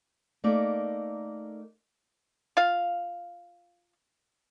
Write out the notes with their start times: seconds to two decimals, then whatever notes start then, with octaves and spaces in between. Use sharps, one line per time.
0.44 A3 A#3 D#4 A#4 D5
2.57 F4 F5